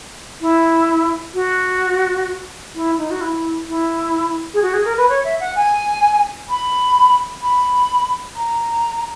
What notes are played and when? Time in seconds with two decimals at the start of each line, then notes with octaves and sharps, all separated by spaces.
0.41 E4
1.34 F#4
2.75 E4
2.98 D#4
3.11 F#4
3.21 E4
3.69 E4
4.54 G#4
4.62 F#4
4.74 G#4
4.85 A#4
4.98 B4
5.09 C#5
5.24 E5
5.40 F#5
5.56 G#5
6.50 B5
7.42 B5
8.36 A#5